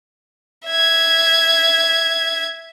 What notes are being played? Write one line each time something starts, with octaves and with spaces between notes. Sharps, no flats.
E5 G#6